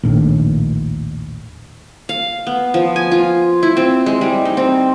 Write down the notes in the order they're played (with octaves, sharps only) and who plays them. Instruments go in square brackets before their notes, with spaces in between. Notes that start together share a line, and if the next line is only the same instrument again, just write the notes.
[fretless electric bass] A#1 D#2 A2
[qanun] F5
B3
F3
G#5
F4
E4
C4
G#3
G3
D#4
C4